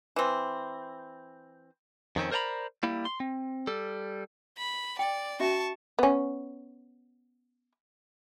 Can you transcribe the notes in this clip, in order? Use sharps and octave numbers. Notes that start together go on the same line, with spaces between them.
E3 C4
F2 D#3 C4 C#4
A#4 C5 D5 G5 A#5 B5
G3 A#3 E4
C6
C4
G3 A4
B5
D5 G5
C#4 F#4 E5 A5 C#6
B3 C#4